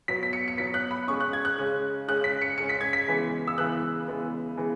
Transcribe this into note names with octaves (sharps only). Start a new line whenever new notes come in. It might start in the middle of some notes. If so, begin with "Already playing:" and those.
B2 F#3 B3 B6
B6
C#7
C#7
B2 F#3 B3 B6
F#6
B5
C#3 G#3 C#4 C#6
F#6
G#6
F#6
C#3 G#3 C#4
C#3 G#3 C#4 F#6
B6
C#7
C#3 G#3 C#4 C#7
B6
G#6
B6
C#3 E3 G#3 B3
E6
C#3 E3 G#3 B3 F#6
C#3 E3 G#3 B3
C#3 E3 G#3 B3